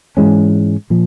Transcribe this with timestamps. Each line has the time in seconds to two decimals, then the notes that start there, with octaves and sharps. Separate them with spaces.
0.17 G#2 E3 G#3 C#4
0.90 A#2 F3